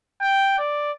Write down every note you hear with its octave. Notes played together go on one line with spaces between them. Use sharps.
G5
D5